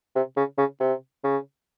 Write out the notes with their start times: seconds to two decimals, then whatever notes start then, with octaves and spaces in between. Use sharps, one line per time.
0.16 C3
0.37 C#3
0.58 C#3
0.80 C3
1.24 C#3